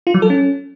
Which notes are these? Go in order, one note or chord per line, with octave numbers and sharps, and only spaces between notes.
F4
F#3
A4
C#4